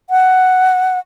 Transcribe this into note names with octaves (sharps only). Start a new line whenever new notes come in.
F#5